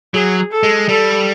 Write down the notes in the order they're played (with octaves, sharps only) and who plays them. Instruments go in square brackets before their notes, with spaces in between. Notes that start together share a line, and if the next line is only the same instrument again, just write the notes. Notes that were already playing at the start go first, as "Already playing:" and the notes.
[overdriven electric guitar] F#3 [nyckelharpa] G#4
[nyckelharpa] A4
[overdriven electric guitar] G#3
[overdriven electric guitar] G3 [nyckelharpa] A4